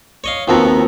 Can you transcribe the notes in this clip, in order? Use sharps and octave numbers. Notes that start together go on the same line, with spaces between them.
C#5 D#5 F5
D#2 F3 B3 C4 F#4 A#5